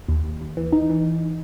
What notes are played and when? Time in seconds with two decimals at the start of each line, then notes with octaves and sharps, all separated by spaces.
0.09 D#2
0.24 D#2
0.41 D#2
0.57 E3
0.73 D#4
0.90 E3